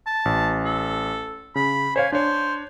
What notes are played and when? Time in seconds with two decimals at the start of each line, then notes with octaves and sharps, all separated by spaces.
0.06 A5
0.25 A1
0.64 A4
1.55 C#3 B5
1.96 C5 C#5 F5 G#5
2.12 D4 C5 C#5